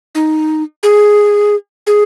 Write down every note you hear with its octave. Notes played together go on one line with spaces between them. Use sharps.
D#4
G#4
G#4